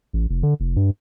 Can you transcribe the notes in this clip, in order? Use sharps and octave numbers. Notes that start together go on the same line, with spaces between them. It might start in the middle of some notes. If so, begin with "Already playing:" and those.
A1
F1
D3
F1
G2